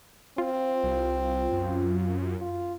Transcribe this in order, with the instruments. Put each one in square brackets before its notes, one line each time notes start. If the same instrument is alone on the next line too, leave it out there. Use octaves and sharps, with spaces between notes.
[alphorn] C4 [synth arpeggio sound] F4
[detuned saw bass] C2
F#2
[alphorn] F4